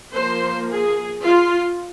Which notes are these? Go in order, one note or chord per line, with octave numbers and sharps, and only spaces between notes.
F3 A#3 C5
G#4
F4